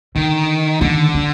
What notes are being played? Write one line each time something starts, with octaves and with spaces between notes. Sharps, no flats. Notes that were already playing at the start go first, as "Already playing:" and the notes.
D3 D#3
D3 D#3
D4